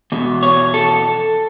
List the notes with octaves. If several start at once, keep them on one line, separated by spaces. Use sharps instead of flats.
E2 B2
C#5
A4